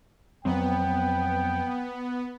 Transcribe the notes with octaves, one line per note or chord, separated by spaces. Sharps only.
F2 F#3 B3 C4 G5